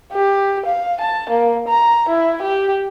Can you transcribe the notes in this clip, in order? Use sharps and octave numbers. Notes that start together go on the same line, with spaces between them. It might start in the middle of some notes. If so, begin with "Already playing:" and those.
G4
F5
A5
A#3
A#5
E4
G4